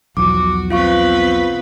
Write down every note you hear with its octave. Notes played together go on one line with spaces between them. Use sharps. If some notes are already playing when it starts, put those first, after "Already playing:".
B1 E2 F3 F#4 D6
B3 C4 F4 B4 F5 C#6